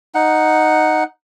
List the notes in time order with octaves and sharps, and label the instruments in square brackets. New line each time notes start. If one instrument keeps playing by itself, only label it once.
[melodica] D#4 F#5